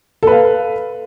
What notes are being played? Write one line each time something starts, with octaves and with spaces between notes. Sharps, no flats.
A4 B4 F5